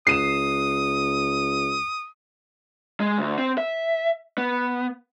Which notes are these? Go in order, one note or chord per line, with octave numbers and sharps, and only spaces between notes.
C#2 D#6 C7 D#7 E7
G#3
D2
C4
E5
B3